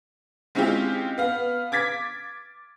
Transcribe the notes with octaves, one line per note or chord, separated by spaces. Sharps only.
G#3 C4 C#4 E4 F4 G4
B3 F5
D6 G#6 A6 B6